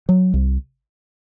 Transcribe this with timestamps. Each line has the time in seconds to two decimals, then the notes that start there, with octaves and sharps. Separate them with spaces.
0.09 F#3
0.34 C2